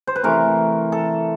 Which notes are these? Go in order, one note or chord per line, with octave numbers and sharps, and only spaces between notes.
C5
B4
C3 E3 A3 A#4
A4